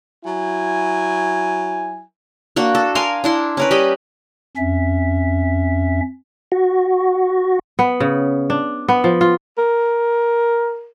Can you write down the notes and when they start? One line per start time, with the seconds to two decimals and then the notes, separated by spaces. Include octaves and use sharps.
0.25 F#3 E4 G#5
2.56 A#3 D4 F#4
2.75 A4
2.95 A#4 F5 G#5 C6
3.24 D4 E4 C6
3.57 C#4 A#4 B4
3.71 G3 G4 D#5 B5
4.57 F2 C#4 E5
6.52 F#4
7.79 B3
8.00 C#3
8.50 D4
8.88 B3
9.04 F3
9.21 F4
9.58 A#4